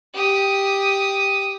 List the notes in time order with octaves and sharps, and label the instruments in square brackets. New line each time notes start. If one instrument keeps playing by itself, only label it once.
[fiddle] G4 D#6